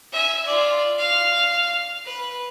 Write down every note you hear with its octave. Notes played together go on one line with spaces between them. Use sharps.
E5 G#5
F4 D5
F5
B4